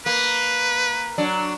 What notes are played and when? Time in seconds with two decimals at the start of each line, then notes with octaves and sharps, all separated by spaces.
0.06 A#3 B4
1.18 F#3 D4